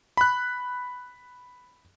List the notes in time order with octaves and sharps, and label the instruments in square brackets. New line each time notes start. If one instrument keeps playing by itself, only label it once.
[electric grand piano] B5 F#6